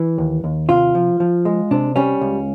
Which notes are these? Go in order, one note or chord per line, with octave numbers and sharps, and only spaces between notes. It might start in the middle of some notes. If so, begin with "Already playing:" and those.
Already playing: E3
D#2
D#2
C3 F4
F3
F3
G#3
C3 D4
G3 C#4
C#2